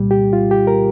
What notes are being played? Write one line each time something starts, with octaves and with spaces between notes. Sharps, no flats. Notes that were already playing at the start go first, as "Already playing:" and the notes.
Already playing: C2 A#2 G3
G4
F4
G4
A#4